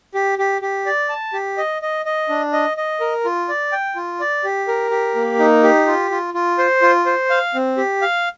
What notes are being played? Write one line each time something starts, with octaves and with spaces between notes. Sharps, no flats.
G4
G4
G4
D5
A5
G4
D#5
D#5
D#5
D4
D#5
D#5
A#4
F4
D5
G5
F4
D5
G4
A#4
G4
A#3
D#4
G4
F4
F4
F4
C5
F4
C5
F5
C4
G4
F5